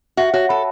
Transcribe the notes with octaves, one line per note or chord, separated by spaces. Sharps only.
F#4 E5
F#4 C#5
A4 B5